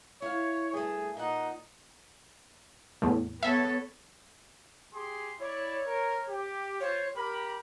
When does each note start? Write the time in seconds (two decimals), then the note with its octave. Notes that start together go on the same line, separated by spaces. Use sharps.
0.22 E4 C#5 F5
0.73 G2 A3 G#4
1.17 A#2 D#4 F#5
3.02 E2 A2
3.43 B3 A4 C#5 E5
4.93 G4 G#4 C6
5.40 E4 C#5 D5
5.86 A#4
6.29 G4
6.80 F4 C5 C#5
7.15 G4 A#4 B5